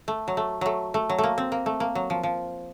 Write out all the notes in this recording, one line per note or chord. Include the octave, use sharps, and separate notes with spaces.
A3
F#3
A3
F#3 A3
A3
F#3
A3
A#3
C4
A#3
A3
A#3
F#3
F3
F3